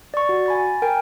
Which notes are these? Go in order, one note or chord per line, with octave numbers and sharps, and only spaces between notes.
D5 C#6
F#4
G#5 B5 A6
A#4 G5 G#5